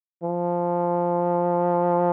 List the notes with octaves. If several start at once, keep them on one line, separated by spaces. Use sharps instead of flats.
F3